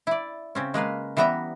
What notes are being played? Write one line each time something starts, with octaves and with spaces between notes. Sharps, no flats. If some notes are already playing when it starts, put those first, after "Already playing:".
E4 D5
C#3 C4 C#4
G#3 A#3 B4 F5
E3 G3 B3 E5 A#5